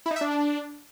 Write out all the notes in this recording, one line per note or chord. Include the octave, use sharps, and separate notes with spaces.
E4
D#4
E5
D4